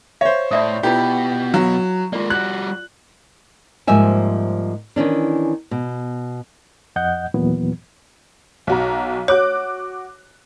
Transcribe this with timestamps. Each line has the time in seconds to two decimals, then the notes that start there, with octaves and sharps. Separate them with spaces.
0.21 C5 C#5 E5 F5
0.51 A2 D5 E5 D#6
0.83 B2 E4 F4 G4 B4
1.54 F#3 F5
2.13 G#3 A#3 F4 D5
2.30 G3 F#4 F#6
3.87 G#2 F3 G3 A#3 E5 G#5
4.96 D#3 E3 C#4 D4
5.71 B2
6.96 F2 D#5 F#5 G6
7.34 D#2 A#2 E3 F#3 B3
8.67 B1 F#4 A#5
9.28 F#4 C#5 D6 F#6